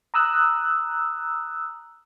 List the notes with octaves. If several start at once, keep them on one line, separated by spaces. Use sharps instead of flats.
A#5 D#6 E6 F#6